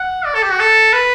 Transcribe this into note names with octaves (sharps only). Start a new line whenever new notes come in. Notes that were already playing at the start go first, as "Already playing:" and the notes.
Already playing: F#5
D5
A4
G4
F#4
A4
B4